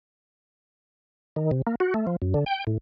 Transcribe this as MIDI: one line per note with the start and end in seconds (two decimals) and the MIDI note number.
1.36 1.51 51
1.51 1.62 48
1.67 1.75 58
1.80 1.94 66
1.94 2.06 57
2.07 2.16 53
2.22 2.34 42
2.34 2.44 50
2.46 2.64 79
2.67 2.78 45